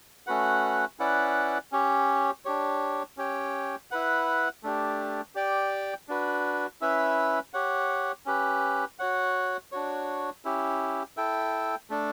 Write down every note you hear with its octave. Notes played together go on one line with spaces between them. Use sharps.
A3 C#4 F#4 B4 F#5
C#4 E4 B4 D5 F#5
C#4 G4 C#5
D4 G4 C#5
C#4 G4 C#5 G5
E4 B4 F#5
A3 D4 G4
G4 D5 G5
D4 F#4 B4
C#4 E4 B4 E5
G4 C#5 F#5
C#4 G4 B4
F#4 C#5 F#5
D4 F#4 C#5
C#4 E4 G4
E4 A4 E5 G5
A3 D4 A4